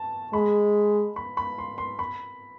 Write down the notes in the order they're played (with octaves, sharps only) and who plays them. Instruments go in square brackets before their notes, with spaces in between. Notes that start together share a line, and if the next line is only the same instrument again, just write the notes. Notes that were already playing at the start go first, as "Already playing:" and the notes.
Already playing: [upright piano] A5
[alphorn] G#3 [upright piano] B5
[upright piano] B5
B5
C6
C6
B5